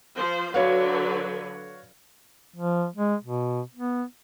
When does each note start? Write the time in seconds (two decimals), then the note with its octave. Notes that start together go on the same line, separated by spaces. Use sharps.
0.16 F3 C5
0.54 D3 F#3 F#4 B4 C#5 F5
2.56 F3
2.96 G#3
3.23 B2
3.74 B3